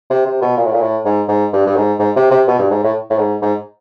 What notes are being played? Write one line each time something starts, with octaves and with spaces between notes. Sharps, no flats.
C3
C3
B2
A#2
A2
A#2
A2
G#2
G#2
G2
G2
G#2
G#2
C3
C3
B2
G2
G#2
A2
A2
G#2
G#2